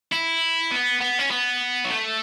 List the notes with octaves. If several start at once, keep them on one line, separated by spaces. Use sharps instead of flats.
E4
B3
B3
C#4
B3
F#3
A3